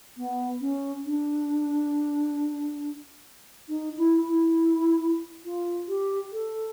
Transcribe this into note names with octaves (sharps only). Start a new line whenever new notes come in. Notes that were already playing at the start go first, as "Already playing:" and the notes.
B3
C#4
D4
D#4
E4
E4
F4
G4
A4